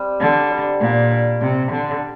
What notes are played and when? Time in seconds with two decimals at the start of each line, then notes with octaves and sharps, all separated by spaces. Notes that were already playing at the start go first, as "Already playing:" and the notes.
Already playing: G3 C4 G4
0.20 D3 D4
0.51 G3
0.81 A#2 D5
1.11 D4
1.41 C3 G4
1.71 D3 D5